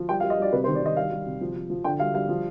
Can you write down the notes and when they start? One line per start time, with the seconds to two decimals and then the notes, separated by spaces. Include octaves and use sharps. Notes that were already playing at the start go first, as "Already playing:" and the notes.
Already playing: F3
0.09 G3 G5
0.20 F5
0.23 G3
0.30 D#5
0.38 G3 D5
0.52 C3 B4
0.64 C5
0.67 D#3
0.75 D5
0.82 D#3 D#5
0.97 G3 F5
1.12 G3
1.26 C3
1.41 F3
1.56 F3
1.70 F3
1.84 D3 G5
2.00 G3 F5
2.14 G3 F5
2.29 F3